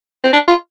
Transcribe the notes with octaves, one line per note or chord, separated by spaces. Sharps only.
C4
D4
F4